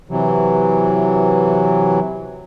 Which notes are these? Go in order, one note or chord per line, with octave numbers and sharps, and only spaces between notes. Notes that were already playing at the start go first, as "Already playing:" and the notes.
C3 E3 F#3